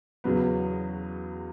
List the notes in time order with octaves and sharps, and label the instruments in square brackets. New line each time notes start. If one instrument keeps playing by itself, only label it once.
[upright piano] E2 C#3 F#3 B3